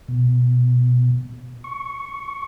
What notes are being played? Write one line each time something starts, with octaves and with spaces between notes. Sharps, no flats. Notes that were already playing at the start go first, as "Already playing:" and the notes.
B2
C#6